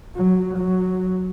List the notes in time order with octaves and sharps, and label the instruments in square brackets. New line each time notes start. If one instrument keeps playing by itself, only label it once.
[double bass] F#3
F#3